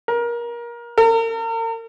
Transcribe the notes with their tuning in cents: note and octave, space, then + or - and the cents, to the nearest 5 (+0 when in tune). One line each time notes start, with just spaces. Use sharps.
A#4 +25
A#4 -40